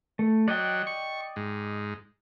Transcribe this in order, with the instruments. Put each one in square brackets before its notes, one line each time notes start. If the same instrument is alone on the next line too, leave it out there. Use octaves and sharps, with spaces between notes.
[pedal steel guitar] A3
[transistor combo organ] F#3 [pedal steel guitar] D5 D#5 G5
[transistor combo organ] C#6
G#2